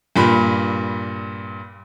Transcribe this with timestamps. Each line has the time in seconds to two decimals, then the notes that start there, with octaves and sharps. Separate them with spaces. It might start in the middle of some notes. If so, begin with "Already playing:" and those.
0.16 G2 A#2 B5